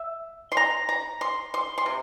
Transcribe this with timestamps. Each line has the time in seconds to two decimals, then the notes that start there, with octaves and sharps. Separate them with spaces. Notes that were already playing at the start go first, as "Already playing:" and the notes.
Already playing: E5
0.52 C6
0.57 A#5
0.89 A#5
1.21 C6
1.54 C6
1.78 C6
1.86 C3